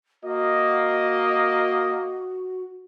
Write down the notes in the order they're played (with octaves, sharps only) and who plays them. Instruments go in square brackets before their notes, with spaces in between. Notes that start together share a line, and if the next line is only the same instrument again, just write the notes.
[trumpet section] A#3 D#5 [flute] F#4